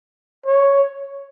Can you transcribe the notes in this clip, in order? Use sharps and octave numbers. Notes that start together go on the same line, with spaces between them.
C#5